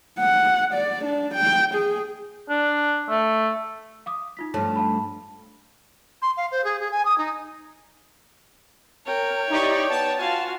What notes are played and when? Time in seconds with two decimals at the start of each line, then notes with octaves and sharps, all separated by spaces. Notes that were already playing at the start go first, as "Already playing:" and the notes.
0.19 F#5
0.74 D5
1.05 D4
1.34 G5
1.74 G#4
2.50 D4
3.09 A3
4.06 F5 D6 D#6
4.37 D#4 F4 B6
4.54 G2 F3 A3 C#5 A5
4.76 F5 A5 B5
6.22 C6
6.37 F5
6.51 C5
6.64 G#4
6.80 G#4
6.91 G#5
7.05 D#6
7.18 D#4
9.06 A#4 C#5 G5
9.50 D#4 E4 G4 D5 C#6
9.89 B3 A5
10.19 F4 F#4 F5 G#5